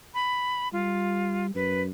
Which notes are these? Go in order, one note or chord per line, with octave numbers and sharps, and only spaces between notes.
B5
G3 F4
F#2 B4